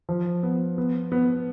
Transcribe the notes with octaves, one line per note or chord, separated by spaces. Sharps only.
F3
B3
B3
B3